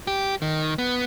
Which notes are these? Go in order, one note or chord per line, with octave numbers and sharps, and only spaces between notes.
G4
D#3
B3